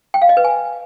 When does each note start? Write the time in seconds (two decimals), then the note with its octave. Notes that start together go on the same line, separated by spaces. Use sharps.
0.14 G5
0.22 F5
0.29 D#5
0.37 B4
0.44 G#5